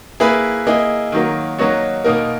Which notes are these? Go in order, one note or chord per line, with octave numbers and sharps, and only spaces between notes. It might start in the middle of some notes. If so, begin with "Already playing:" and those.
A#3 E4 G#4 B4
A#3 E4 G#4 D#5
D#3 F#3 A#3
F#3 A#3 D#4 F#4 C#5
B2 A#3 D#4 A#4